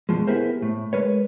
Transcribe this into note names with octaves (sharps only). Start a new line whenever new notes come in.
F#2 B2 D3 F3 G#3
B3 E4 G4 G#4 A#4 C5
A2
G#3 A#4 B4 C#5